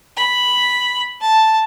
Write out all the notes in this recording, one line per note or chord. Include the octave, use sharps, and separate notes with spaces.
B5
A5